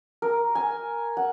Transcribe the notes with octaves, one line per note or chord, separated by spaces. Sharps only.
A#4
G#5
F#5